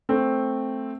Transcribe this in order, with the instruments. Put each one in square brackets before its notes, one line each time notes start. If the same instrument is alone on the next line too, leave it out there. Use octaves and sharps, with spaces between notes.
[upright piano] A3 C4